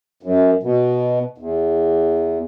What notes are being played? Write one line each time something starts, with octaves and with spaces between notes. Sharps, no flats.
F#2
B2
E2